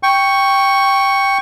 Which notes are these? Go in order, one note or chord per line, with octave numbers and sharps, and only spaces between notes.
G5 C#6